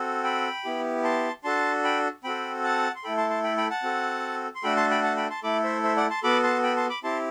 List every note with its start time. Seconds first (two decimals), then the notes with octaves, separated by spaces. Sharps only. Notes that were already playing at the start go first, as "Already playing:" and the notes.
Already playing: C4 F#4 A4
0.24 G5 B5
0.65 B3 E4 G4
1.04 A5 C6
1.44 D4 F#4 A4 A5 C6
1.84 G5 B5
2.24 C4 F#4 A4 G5 B5
2.64 F#5 A5
2.96 C6
3.04 A3 E4 A4 G5 B5
3.17 A5 C6
3.30 A5 C6
3.43 G5 B5
3.57 G5 B5
3.70 F#5 A5
3.83 C4 F#4 A4
4.55 C6
4.63 A3 D4 F#4 A4 G5 B5
4.77 A5 C6
4.90 G5 B5
5.03 F#5 A5
5.17 G5 B5
5.30 A5 C6
5.43 A3 E4 A4 B5 D6
5.64 C5 E5
5.83 C5 E5
5.97 D5 F#5
6.10 A5 C6
6.23 B3 F#4 A4 B5 D6
6.43 A5 C6
6.63 G5 B5
6.77 A5 C6
6.90 B5 D6
7.04 C4 E4 G4 A5 C6